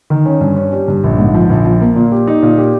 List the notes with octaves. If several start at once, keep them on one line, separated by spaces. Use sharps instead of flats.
D#3
C#4
G2
C#4
G3
G2
A#1
G#2
F3
A#1
F3
A#3
A#2
G4
D#4
A#2
G4